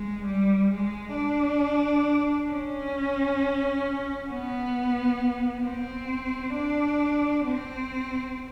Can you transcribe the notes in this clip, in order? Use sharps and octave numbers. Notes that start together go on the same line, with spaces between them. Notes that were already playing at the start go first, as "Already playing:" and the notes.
Already playing: G#3
G3
G#3
D4
C#4
B3
C4
D4
C4